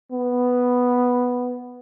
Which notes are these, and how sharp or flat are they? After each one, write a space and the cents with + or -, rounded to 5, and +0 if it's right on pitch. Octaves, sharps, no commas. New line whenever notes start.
B3 +0